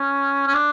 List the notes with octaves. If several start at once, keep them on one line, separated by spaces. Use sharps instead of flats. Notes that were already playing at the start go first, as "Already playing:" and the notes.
Already playing: C#4
C#4
D4